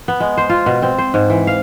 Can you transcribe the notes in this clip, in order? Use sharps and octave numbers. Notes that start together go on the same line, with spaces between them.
B3
G#3
C5
F4
B2
C4
C5
G#2
E3
F5